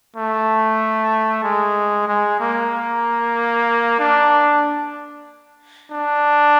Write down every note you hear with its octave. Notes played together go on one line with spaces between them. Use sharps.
A3
G#3
G#3
A#3
D4
D4